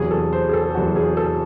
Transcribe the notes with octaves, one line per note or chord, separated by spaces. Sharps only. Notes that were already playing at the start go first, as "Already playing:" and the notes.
Already playing: E2 C3 F#3 G#4
A4
C5
G#4
A4
E2 C3 F#3 F#4
G#4
A4